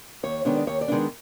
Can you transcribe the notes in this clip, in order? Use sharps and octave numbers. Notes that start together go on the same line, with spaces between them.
D#2 C#5
D#3 G#3 B3 D4 C#5
D5
D#2 C#5
D5
D#3 G#3 B3 D4